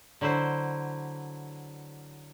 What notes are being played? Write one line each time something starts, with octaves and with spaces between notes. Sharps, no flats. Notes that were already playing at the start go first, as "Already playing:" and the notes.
D3 F#3 E4 C5